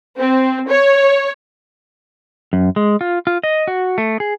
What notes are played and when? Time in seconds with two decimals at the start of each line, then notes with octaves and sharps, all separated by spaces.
0.18 C4
0.69 C#5
2.53 F#2
2.76 G#3
3.01 F4
3.27 F4
3.43 D#5
3.68 F#4
3.98 A3
4.20 G#4